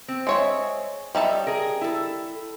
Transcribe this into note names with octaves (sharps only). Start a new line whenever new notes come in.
C4
G#3 C#5 E5
G3 D#4 C#5 E5 A5
G#4 A#4
E4 A4